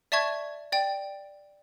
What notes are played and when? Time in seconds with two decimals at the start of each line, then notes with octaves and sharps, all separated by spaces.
0.12 D5 E5 A5 C#6 G#6
0.72 D5 G5